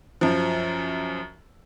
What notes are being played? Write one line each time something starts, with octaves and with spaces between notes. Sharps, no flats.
F#2 F3